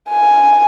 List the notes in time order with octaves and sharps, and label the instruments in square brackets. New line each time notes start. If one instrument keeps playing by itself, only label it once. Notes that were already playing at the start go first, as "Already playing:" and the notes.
[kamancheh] G#5